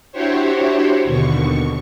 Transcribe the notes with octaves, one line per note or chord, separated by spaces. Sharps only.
D4 E4 F#4 G4 C5 C#5
D#2 B2 D3 C#6